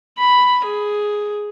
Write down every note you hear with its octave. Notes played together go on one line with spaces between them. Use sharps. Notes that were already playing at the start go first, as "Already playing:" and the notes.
B5
G#4